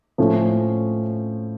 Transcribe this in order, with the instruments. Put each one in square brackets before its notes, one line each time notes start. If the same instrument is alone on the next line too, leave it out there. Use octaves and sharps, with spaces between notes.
[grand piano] A2 F3 A3 C#4